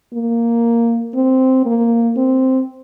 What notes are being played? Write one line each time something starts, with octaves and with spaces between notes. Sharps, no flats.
A#3
C4
A#3
C4